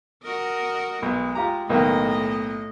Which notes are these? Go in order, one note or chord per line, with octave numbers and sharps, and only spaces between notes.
F#4 A#4 D#5
B1 G#3
F4 G4 A#5
B1 A2 D#3 A#3 D#5